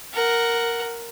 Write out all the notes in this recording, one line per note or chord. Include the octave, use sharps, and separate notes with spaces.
A#4 F#5